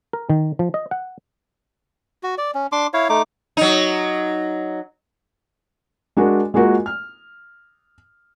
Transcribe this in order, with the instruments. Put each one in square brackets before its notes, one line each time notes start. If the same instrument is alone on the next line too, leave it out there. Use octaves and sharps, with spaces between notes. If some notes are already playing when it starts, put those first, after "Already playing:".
[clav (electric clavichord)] A#4
D#3
F3
D#5
F#5
[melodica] F#4
D5
C#4
D4 C6 D6
E4 C#5 F5
A3 D#4 D6
[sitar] F#3 D#4
[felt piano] G#3 D4 F#4 A#4
G#3 A#3 F4 F#4 A#4
F6